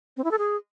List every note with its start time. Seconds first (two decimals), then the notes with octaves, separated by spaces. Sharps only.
0.17 C4
0.24 E4
0.31 A4
0.38 G#4